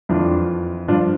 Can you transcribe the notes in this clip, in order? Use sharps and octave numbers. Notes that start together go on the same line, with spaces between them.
F2 E3 D4 F4
G2 F3 D4 F4